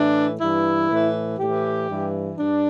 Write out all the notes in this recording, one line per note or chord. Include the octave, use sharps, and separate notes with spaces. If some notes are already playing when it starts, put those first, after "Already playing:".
Already playing: A2 E3 D4
G2 E3 E4
A2 E3
A2 E3 G4
G2 E3
G2 D4